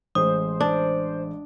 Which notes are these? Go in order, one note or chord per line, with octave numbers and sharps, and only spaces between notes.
A1 G#3 C5 D#6
D4